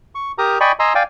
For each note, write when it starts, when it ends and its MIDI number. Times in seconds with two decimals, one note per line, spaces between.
0.15 0.32 85
0.38 0.58 67
0.38 0.58 70
0.38 0.58 82
0.38 0.58 87
0.60 0.72 74
0.60 0.72 75
0.60 0.72 79
0.60 0.72 80
0.60 0.72 83
0.60 0.72 85
0.80 0.93 75
0.80 0.93 80
0.80 0.93 82
0.80 0.93 84
0.80 0.93 88
0.95 1.03 74
0.95 1.03 77
0.95 1.03 79
0.95 1.03 80